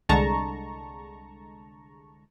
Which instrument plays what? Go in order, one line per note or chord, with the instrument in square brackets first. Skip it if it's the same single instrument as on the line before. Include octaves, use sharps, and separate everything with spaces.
[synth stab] C2 D3 G#3 A5 A#5 C#6